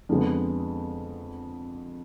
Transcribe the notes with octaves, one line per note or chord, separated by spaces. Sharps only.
F2 D3 G#3 B3